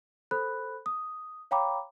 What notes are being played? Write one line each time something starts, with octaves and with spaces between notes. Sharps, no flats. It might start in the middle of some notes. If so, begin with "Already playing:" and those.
A4 C5 B5 F#6
D#6
C#5 F5 G5 A#5 B5 D6